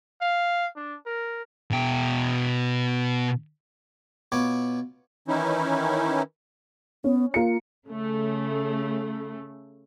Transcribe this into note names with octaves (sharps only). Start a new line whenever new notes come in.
F5
D4
A#4
B2 G5
B2 B3 F4 C#5 D6
D#3 E3 C#4 D#4 E4
B3 C#4
A#3 F4 C#7
C#3 A3